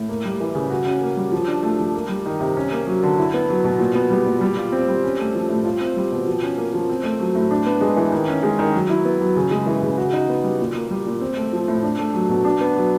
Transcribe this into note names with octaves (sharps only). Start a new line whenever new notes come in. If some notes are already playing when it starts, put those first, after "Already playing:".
Already playing: A2
A#3
G3
E3
C#3
F#4
C#4
A#3
G3
F3
D4
A3
F3
A#3
G3
D#3
C3
C#4
A#3
F#3
D3
E4
B3
F#3
B2
A#2
B3
G3
A#2
G3
F4
C4
G3
C#4
A3
F3
A2
F4
C4
G3
B2
F3
C#4
A#3
F3
C4
A3
F#3
A2
D4
B3
G#3
E3
D#3
C#4
G#3
D#3
F#3
E4
B3
F#3
C#3
G#3
E3
C#3
F#4
D#4
B3
G3
A#2
A#3
G3
A#2
C4
A3
F3
A2
D4
A3
F#3
B2
D4
B3
F#3